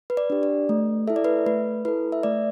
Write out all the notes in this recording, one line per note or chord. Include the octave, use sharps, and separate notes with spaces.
B4
D5
D4 G4
D5
A3
E4 A4 E5
D5
B4 E5
A3 B4
E4 A4 B4
E5
A3 D5